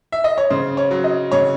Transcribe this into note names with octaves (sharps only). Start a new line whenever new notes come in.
E5
D#5
C#5
C#3 C5
C#5
F#3
D#5
C#3 C#5